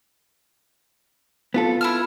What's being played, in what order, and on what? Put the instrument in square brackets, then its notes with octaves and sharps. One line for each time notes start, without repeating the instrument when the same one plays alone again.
[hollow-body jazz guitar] B3 F4 A4
[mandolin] E4 A5 F6